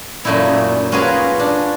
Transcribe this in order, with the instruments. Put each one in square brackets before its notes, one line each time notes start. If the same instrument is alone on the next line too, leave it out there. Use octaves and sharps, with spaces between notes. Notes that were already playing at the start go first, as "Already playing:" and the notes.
[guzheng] F#2 A#2 A3 D#4 E4
C#4 F4 F#4 G#4 A#4 B4
D4